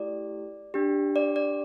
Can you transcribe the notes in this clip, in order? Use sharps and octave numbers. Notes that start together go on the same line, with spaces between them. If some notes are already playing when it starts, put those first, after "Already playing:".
Already playing: A3 E4 G4 D5
D4 G4
D5
D5